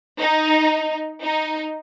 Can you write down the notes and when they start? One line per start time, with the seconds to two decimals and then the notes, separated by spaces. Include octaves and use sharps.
0.21 D#4
1.23 D#4